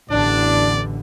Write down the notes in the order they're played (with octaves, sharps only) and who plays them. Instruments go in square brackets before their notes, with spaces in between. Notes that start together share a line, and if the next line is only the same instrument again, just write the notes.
[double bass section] A1 E2 D3 [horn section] D4 [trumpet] D5